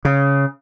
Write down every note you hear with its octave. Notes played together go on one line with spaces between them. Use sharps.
C#3